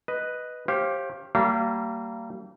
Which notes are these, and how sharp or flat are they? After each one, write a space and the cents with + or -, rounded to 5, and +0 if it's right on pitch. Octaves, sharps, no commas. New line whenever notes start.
B4 +0 D#5 +0
G4 +0 C5 +40 F5 +0
G3 -30 A#3 -30 F5 -35